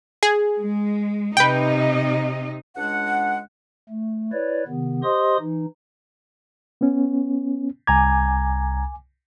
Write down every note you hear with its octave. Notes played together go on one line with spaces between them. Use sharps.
G#4
G#3
C3 D#4 B4 D#5 G5
C#2 G#3 D4 F#5
A3
E4 B4 C#5 D5
C3 D#3 B3
G4 C5 D#5 C6 D#6
E3 D#4
B3 C#4
C2 G#5 A#5 D6 G#6